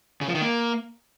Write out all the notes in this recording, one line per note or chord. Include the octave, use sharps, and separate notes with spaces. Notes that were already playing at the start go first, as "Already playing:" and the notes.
C#3
F3
D#3
A#3